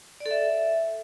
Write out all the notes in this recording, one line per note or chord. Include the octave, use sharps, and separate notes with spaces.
D5
A4
E5